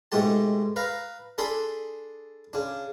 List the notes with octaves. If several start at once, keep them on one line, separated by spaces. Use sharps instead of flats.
G#2 B2 G#3 A3 G4 A5
B4 F5 A#5
D4 G#4 A4 B5 C6
C#3 D4